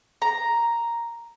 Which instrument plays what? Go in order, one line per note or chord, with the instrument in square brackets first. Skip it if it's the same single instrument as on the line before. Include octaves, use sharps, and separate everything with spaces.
[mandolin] A#5